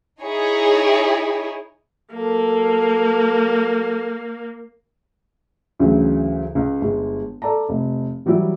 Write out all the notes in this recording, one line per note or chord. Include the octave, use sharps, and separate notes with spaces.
D#4 E4 G#4 C#5
F#3 A#3 A4
D2 C#3 E3 F#3
C#2
G1 G#3
A4 D5 A5 A#5
F1
E3 F#3 G3 E4